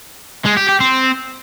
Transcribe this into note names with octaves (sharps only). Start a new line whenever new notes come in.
G#3
G4
G4
C4